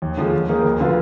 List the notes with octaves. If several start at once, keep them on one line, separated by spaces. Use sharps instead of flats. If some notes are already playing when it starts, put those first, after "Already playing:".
D#2
D3 F3 G#3
D#2
D#3 A#3 D#4 G#4
D2
D3 F3 B3 F4